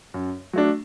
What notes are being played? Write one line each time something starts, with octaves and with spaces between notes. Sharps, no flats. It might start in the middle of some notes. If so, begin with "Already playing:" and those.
F#2
F#3 A3 D4